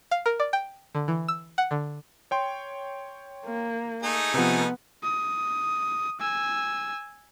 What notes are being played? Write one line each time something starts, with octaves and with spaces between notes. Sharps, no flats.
F5
A#4
D5
G5
D3
E3
E6
F#5
D3
C#5 G5 C6
A#3
A3 D#4 G#4
C3 F3 B3
D#6
G#5 E6